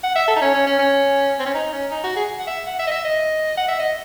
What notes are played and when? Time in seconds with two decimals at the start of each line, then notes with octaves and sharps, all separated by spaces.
0.03 F#5
0.15 E5
0.28 A4
0.36 D#4
0.41 C#4
0.54 C#4
0.67 C#4
0.79 C#4
1.39 C4
1.46 C#4
1.54 D#4
1.73 C#4
1.91 D#4
2.04 F#4
2.16 G#4
2.39 F#5
2.47 E5
2.67 F#5
2.79 E5
2.87 D#5
2.91 E5
3.05 D#5
3.57 F#5
3.68 E5
3.79 D#5